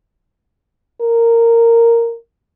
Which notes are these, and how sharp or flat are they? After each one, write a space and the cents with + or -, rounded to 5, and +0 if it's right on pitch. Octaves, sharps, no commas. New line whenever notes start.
A#4 -10